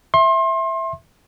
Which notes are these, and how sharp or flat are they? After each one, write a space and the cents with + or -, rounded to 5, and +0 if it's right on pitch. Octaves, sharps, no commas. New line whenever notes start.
E5 +0 C6 +30